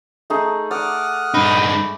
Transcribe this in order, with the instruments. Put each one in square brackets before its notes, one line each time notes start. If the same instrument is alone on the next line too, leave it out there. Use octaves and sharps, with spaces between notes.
[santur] A3 D#4 G#4
[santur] D5 [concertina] F#5 D#6 F6
[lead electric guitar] G2 D#4 [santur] B5